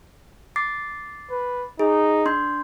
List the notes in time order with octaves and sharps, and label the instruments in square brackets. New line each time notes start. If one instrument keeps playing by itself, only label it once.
[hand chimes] D6 A6 C7
[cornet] B4
[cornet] D#4 [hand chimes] G#4
[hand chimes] D4 C6 G6